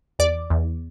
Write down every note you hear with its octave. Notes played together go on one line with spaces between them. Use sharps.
E2 D5 D6
E2